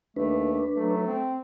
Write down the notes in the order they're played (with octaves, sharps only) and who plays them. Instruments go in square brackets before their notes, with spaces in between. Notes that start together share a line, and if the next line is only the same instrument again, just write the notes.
[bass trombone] D#2 [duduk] A3 [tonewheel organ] D4 B4
[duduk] F#3 [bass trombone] A3
[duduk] C4